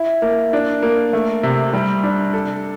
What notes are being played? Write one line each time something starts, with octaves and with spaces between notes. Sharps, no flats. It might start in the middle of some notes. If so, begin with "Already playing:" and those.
Already playing: E4
A#3
D4
A#3
A3
C3
G3
D4
A4